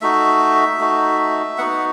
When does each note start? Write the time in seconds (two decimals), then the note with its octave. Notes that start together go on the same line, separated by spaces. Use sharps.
0.01 A3 D#4 F#4 E5
0.80 A3 D#4 F#4
1.58 B3 D#4 F#4 F#5